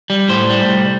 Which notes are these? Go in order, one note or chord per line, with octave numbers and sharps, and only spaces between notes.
G3
A2 C5
G3
C2